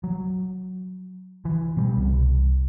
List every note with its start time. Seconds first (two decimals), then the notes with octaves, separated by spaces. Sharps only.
0.04 F#3
1.45 E3
1.77 B2 G3
1.98 C2